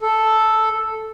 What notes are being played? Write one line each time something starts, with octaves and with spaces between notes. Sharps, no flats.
A4